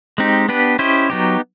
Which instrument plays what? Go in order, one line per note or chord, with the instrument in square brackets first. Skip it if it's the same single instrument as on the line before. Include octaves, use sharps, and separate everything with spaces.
[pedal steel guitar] G#3 C4 D#4 G4
B3 D4 G4 B4
C#4 E4 G4 C5 D#5
F#3 B3 D#4 G4